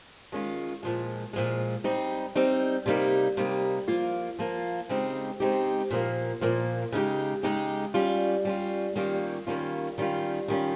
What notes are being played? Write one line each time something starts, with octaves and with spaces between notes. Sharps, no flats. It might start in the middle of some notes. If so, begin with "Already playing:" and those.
D#3 G#3 C#4 F4
A#2 F3 G#3
A#2 F3 G#3
G3 C4 D#4
G3 C4 D#4
C3 G3 A#3 D#4
C3 G3 A#3 D#4
F3 A#3 F4
F3 A#3 F4
C#3 G#3 C4 D#4 G4
C#3 G#3 C4 D#4 G4
A#2 F3 A#3
A#2 F3 A#3
C#3 G#3 D#4 G4
C#3 G#3 D#4 G4
G3 C#4 F4
G3 C#4 F4
D#3 G3 A#3 C#4 F4
D#3 G3 A#3 C#4 F4
D#3 G3 C#4 F4
D#3 G3 C#4 F4